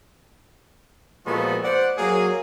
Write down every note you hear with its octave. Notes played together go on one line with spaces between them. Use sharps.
A#2 F3 G#3 B3 F#4 A4
C5 D5 F#5
F#3 A#3 G#4